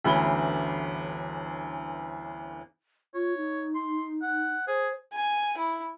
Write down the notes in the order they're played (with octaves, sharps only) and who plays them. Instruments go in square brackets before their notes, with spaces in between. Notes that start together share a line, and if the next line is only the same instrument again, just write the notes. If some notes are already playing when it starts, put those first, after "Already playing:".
[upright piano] G1 D2 E3 C#4 B5 G7
[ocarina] F4 [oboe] C#5
[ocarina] D#4
[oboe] C6
F#5
[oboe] G#4 [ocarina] C5
[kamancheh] G#5
E4